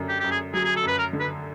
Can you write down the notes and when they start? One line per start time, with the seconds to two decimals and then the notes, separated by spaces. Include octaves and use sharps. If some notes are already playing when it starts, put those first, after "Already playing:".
Already playing: F#2 D3
0.09 G4
0.20 F#2 G4
0.31 G#4
0.54 F#3 G#4
0.65 G#4
0.76 A4
0.83 F#2 B4
0.98 A#4
1.13 D3
1.20 B4